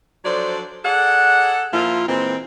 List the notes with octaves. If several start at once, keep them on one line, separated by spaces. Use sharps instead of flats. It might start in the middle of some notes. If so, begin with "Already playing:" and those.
F3 F#3 D4 A4 C5 D5
G#4 A4 D5 F#5
A#2 F3 E4 F4
A#2 E3 G#3 C4